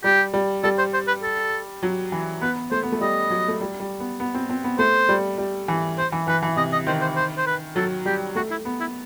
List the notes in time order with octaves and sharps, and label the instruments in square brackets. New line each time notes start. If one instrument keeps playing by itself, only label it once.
[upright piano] G3 [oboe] G4
[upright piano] G3
[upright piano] G3 [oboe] A4
[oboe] C5
C5
B4
A4
[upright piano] F#3
E3
[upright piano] B3 [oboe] B4
[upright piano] A3 [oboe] C5
[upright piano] B3
A3
[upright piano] G3 [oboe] D#5
[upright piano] F#3
A3
G3
G3
B3
B3
C4
C4
B3
[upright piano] A3 [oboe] C5
[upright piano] G3
G3
E3
[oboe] C5
[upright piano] E3
[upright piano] E3 [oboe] B4
[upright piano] E3
[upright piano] C3 [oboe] D#5
[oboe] D#5
[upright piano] D#3 [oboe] C5
[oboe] C5
C5
C5
B4
[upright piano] F#3 [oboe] A4
[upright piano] G3 [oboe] G4
[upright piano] A3 [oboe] F#4
[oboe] E4
[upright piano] B3
[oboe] E4